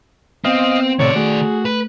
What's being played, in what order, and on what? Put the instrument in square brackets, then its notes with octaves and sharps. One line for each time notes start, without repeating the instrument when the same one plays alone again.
[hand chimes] B3 [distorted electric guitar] C4 [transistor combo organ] D#5 F5
[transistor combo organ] A2 C3 [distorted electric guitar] D#3 D5 [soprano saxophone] C#5
[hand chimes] A3 [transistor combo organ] F#4 [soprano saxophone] G#4
[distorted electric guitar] B4